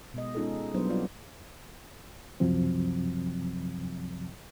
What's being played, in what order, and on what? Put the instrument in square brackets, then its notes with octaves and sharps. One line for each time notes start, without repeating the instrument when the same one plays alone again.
[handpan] B2 G#3 D#5
G#3 C#4 D#4 F4 G#4 A4
F#3 G3 B3 D4 E4 C5
G3 C4 F4 C#5 D5 F5
[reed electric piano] C#2 F#2 C3 F3 F#3 C4